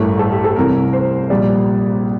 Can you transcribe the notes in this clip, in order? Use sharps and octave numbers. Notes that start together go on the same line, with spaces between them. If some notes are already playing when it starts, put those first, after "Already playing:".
Already playing: A1 G2 E3 A3 A#4
A4
G4
A4
C2 C3 E3 A#4
C5
A#1 A#2 G3 D5